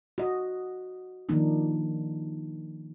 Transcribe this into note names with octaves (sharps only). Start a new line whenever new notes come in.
F#4 D#5
D#3 F3 A#3 D4 D#4